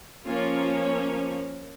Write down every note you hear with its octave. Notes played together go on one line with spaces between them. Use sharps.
F3 A#3 C#4 F4